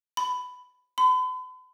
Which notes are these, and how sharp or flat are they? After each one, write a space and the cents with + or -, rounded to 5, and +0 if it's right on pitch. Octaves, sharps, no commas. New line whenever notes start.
B5 +10
B5 +45